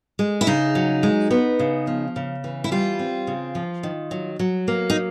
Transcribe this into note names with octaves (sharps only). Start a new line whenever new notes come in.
G#3
E4
C#3 D#4
F#3
G#3
B3
C#3
F3
C#3
E3
E4
G3 F4
C4
C#3
F3
D#3
F#3
F#3
A#3
D#4